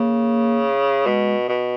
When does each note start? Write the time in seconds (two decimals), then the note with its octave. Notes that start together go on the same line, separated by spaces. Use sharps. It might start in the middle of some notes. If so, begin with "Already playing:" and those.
Already playing: C#3 A#3
1.06 B2 G#3
1.49 B2